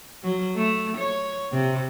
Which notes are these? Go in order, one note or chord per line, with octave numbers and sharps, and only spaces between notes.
F#3
A3
C#5
C3